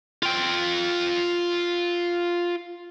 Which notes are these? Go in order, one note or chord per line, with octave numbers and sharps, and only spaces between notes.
F4 G5